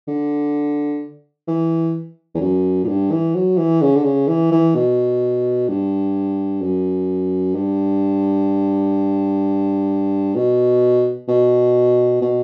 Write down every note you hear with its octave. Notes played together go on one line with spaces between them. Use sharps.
D3
E3
E2
F#2
A#2
G2
E3
F#3
E3
C#3
D3
C#3
E3
E3
B2
G2
F#2
G2
B2
B2
B2